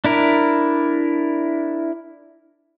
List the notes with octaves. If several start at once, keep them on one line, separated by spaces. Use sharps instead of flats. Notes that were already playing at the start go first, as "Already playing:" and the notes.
D4 E4 A#4